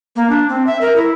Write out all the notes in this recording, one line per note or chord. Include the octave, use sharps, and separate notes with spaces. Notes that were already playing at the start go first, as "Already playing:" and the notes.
A#3
D4
C4
E5
A#4
E4